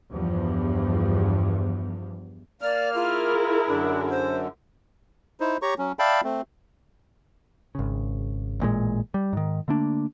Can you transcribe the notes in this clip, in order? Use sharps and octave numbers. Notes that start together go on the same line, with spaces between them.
E2 G2 F3
A#3 D5 F6
E4 F4 G#4 A#4
F#2 D3 D4
C5
D#4 E4 C5
G4 C#5 A#5 C#6
F#3 C#4
D5 E5 F5 G5 A5 B5
A3 C4
G#1 C#3
A1 A#2 C#3 G#3
G3
G#2 D#3
D3 A3 A#3 D4